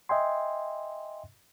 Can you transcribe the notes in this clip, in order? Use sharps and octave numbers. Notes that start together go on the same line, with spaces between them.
D#5 E5 G5 G#5 C6